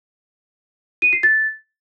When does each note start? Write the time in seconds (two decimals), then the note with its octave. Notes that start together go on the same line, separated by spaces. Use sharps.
1.02 D#7
1.13 C7
1.23 A6